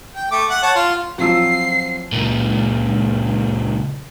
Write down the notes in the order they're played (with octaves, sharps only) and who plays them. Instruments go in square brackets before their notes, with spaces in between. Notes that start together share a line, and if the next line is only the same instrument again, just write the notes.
[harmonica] G5
A3 D6
F#5
C#5 F#5 A5
F4
[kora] F3 F#3 [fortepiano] C4 F4 E6 [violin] C7
[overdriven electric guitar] C#2 A#2